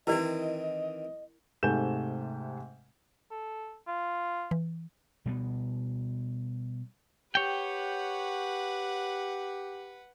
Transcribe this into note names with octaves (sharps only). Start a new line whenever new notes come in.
D#3 E3 C4 E4 A#4 D5 D#5
G#2 C3 A3 G#5 G6 E7
A4
F4
E3
B2 G3 A3 B3
G4 B4 C#5 F#5 G5